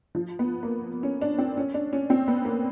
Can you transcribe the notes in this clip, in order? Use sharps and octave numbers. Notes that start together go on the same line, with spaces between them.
F3
B3
A#3
C#4
D4
C4
C#4
D4
C#4
C4
B3
A#3